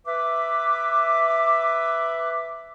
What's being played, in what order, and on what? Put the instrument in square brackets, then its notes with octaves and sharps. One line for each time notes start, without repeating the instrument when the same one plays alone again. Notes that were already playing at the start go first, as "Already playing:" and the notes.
[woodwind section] B4 E5 D6